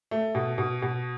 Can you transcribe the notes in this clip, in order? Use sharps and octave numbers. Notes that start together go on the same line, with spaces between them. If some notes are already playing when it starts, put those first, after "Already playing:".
A3
B2
B2
B2